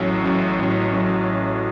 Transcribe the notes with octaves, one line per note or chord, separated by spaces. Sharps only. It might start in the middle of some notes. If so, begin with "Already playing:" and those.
Already playing: A1 A2 F#3 C#4
A1 A2 F#3 C#4
A1 A2 F#3 C#4
A2 F#3 C#4